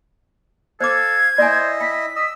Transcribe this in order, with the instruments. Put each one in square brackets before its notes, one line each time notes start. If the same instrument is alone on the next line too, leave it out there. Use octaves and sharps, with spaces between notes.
[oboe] A4 [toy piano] C5 D6 [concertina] F5 [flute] G#6
[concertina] E4 D#5 [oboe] C5 [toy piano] D5 G#5
[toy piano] G5 [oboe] B5 [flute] B6
[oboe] D#5 [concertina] E6